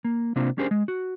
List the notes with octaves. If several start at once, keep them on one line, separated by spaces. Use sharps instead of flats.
A#3
C3 A#3 C4 D4 F4
C#4 D4 G4 G#4 A#4 C5
G#3
F#4